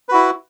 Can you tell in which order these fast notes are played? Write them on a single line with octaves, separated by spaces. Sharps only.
B4 F#4 E4